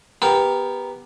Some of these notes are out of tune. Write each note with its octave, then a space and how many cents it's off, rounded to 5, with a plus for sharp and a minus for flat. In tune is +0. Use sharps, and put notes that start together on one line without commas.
B3 +0 G4 +15 A#4 +0